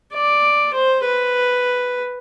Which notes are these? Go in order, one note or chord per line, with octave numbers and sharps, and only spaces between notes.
D5
C5
B4